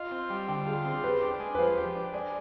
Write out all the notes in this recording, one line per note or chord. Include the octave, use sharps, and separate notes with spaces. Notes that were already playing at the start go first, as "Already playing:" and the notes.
Already playing: F4 D#5
C4
G3
D3 G5
F4 G#4
C4 G#4
G4 B4
D4
G#3
B4
F3 C5
G4
D4
G#3 D5